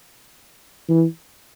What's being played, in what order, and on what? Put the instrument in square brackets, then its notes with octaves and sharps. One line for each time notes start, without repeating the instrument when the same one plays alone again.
[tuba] E3